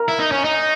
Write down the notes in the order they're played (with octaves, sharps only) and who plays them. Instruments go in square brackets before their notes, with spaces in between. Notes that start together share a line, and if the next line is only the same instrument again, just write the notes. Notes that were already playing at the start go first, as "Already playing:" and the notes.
Already playing: [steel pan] A#4
[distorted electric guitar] E4
D#4
C#4
D#4